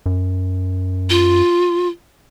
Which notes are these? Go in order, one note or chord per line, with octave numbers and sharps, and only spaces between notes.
F#2
F4